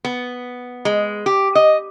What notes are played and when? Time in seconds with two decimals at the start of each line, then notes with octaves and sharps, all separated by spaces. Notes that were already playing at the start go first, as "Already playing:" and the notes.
0.05 B3
0.85 G#3
1.26 G4
1.55 D#5